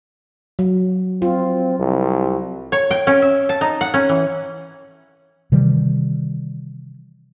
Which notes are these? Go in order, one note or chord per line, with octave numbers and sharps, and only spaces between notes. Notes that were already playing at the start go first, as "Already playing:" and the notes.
F#3
C4 F4
C2
C#5
G5
C#4
E5
A5
D#4
F#5
C#4
E3
C3 D#3 E3 G3